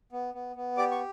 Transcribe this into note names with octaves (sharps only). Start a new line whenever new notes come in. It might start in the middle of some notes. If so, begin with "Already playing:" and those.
B3
B3
B3
G4 D5 D6
C#6